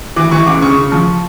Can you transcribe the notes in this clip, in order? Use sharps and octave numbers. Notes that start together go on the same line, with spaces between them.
E3 D6
E3 C#6
C#2 D6
C#3 C#6
C#3
F3